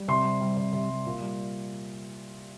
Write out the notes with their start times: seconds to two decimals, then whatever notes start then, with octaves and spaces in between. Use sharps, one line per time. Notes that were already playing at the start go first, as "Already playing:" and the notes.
Already playing: G3
0.08 C3 C6
0.24 G3
0.41 G3
0.57 C3
0.73 C3
0.90 G3
1.06 A#2
1.21 G3